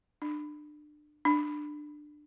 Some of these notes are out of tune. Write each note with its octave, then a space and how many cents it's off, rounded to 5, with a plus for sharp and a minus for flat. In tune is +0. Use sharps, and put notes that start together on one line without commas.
D4 +30
D4 +20